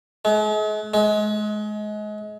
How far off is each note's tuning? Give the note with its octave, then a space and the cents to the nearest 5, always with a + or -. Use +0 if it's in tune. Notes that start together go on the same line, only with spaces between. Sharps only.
G#3 +45
G#3 +30